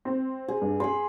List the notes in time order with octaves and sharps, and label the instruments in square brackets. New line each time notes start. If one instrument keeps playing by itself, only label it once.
[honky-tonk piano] C4 G5
[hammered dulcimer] G#4
[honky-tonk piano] G2
[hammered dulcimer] G#4 B5 [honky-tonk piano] C6